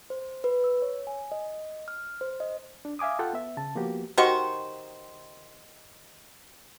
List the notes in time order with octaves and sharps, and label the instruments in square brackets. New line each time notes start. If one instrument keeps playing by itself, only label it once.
[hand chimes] C5
B4
E6
C#5
G#5
D#5
F6
C5
D#5
[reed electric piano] D4
E5 F5 G#5 D6 D#6
F4 A4 F#5 G5
B3 E5
C#3 A5
F3 A#3 B3 F#4 G4
[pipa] D#3 C5 C#6 [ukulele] F#4 G4 D#5